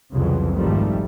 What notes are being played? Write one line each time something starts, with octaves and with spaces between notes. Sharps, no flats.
C2 F2 C#3 E3 F#3
G#1 D#3 F3 G3 A3